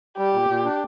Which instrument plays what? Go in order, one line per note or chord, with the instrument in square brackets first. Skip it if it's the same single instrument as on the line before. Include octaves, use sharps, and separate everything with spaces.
[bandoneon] G3 [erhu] G4
[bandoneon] A#2
A#2
D4